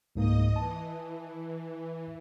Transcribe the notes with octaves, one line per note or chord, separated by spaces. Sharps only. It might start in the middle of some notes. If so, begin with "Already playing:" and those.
C#2 G#2 A#3 D#5 D#6
E3 A5